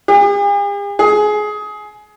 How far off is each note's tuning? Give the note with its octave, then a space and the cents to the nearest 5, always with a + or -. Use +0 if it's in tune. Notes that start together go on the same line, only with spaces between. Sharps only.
G#4 -45
G#4 +20